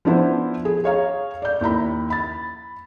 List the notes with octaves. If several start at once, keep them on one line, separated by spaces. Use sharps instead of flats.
F3 B3 D4 E4 C5
G#4
G#4 C#5 F5 A#5
D5 G6
D#2 E4 A#5 B5
B5 A6